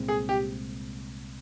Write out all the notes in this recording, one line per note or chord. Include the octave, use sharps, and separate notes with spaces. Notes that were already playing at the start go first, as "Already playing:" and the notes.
Already playing: C2 A#2 G#3 C4
G#4
G4